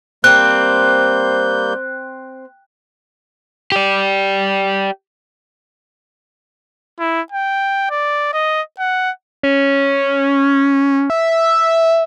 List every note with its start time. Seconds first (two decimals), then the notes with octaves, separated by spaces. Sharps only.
0.24 G3 A#3 C4 F#6 G6
3.72 G4 D5
7.00 E4
7.32 G5
7.90 D5
8.33 D#5
8.79 F#5
9.43 C#4
11.10 E5